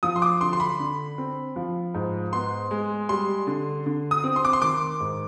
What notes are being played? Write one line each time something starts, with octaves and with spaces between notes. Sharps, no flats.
F3 D#6
C6
D6
D3 C6
C6
B5
D3
C4
F3
G#2
B3 C6
G#3
G3 C6
D3
D3
D#6
C4
C6
D6
C6
D#3 D6
G#2